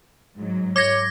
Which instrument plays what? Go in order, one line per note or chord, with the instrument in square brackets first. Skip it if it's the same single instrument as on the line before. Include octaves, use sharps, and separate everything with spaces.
[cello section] G#2 F#3
[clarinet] C#5 [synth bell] D6 G#6 A#6